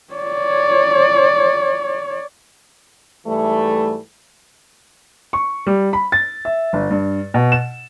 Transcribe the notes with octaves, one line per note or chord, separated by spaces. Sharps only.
C#5 D5
G#2 E3 G3 A3
C#6
G3
B5
A6
E5
G1
G2
B2
E7